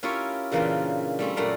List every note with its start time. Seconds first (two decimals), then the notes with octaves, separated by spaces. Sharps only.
0.03 C#4 E4 F4 G4 A#4 C#5
0.51 A#2 C#3 E3 A#3 D4 F4
1.19 G3 A3 C4
1.36 F#2 A#2 A3 D5 F5 A#5